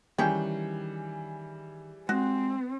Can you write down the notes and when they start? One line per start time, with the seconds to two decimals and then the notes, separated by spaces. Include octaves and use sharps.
0.18 D#3 E3 G3 C#4 G#4 G5
2.09 G#3 C4 F#4